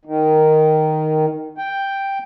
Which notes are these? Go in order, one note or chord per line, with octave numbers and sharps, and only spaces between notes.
D#3
G5